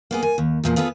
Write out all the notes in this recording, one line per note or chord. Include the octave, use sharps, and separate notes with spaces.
A#3 B3 G#4
G#5
D#2
E2 A#2 F3
B3 F4 G#4 A4 B4